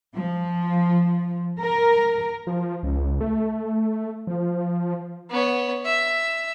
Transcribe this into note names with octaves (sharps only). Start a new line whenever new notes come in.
F3
A#4
F3
C#2
A3
F3
B3 C#5
E5